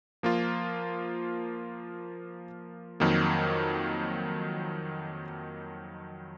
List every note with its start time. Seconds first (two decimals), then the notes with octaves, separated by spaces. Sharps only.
0.23 F3 A#3 F4
3.00 F2 D#3 F#3 A#3